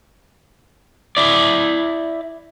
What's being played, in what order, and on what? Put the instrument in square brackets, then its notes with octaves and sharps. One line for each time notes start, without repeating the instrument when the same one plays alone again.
[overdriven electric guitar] E4 D5